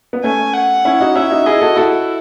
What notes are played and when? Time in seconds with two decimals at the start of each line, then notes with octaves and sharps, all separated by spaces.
0.13 B3
0.24 A3 C#4 G#5
0.54 F#5
0.85 C#4 E4
1.01 D#4 F#4
1.15 C#4 E4 E5
1.31 D#4 F#4
1.46 E4 G#4 D#5
1.61 F#4 A4
1.76 E4 F#4 A4